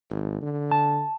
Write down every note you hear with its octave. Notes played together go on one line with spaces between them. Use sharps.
G#1
D3
A5